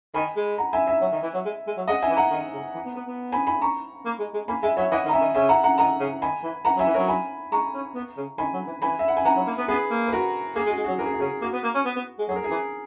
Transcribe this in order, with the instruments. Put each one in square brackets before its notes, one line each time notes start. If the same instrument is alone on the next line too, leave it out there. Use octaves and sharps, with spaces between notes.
[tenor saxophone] D#3 [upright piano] G#5 B5
[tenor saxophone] G#3
[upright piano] F#5 A#5
E5 G#5
E5 G#5
[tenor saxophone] F#3
D#3
E3
F#3
G#3
G#3
F#3
[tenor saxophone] G#3 [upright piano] D#5 F#5
[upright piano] E5 G#5
[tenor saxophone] E3
[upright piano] F#5 A#5
[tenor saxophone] D#3
C#3
E3
B3
B3
B3
[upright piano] G#5 B5
G#5 B5
A#5 C#6
[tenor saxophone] A#3
G#3
G#3
[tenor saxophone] A#3 [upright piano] G#5 B5
[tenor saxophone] G#3 [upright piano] E5 G#5
[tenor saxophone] F#3 [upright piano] C#5 E5
[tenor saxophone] E3 [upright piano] D#5 F#5
[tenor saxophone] D#3
[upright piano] A#5
E5 G#5
[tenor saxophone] D#3
[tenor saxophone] C#3 [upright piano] E5 G#5
[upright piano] F#5 A#5
F#5 A#5
[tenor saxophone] D#3 [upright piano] F#5 A#5
[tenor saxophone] C#3
[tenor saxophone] D#3 [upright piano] G#5 B5
[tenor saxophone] E3
[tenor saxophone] E3 [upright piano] F#5 A#5
[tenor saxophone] F#3
[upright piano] E5 G#5
[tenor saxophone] E3
[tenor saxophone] F#3 [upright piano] A#4 C#5
[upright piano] G#5 B5
[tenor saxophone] G#3 [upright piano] A#5 C#6
[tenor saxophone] C#4
B3
C#3
[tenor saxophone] D#3 [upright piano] G#5 B5
[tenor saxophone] F#3
E3
[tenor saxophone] E3 [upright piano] G#5 B5
[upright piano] E5
F#5
G#5
[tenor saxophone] E3 [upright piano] F#5 A#5
[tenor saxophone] F#3
A#3
B3
[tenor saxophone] B3 [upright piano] G#4 B4
[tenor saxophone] A#3
[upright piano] B4
F#4 A#4
[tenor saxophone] A#3 [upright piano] G#4
[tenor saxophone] G#3
[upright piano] F#4
[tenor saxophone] G#3
[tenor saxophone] F#3 [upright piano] F#4
[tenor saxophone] E3 [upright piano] A#4
[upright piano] G#4
F#4
[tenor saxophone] C#3 [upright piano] G#4
[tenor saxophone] A#3 [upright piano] F#4
[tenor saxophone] B3
A#3
C#4
B3
B3
G#3
[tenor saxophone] F#3 [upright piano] G#4
[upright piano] A#4
G#4
[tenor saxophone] E3